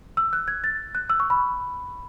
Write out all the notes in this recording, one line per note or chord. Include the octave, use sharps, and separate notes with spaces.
E6
F#6
G#6
A6
F#6
E6
C#6
B5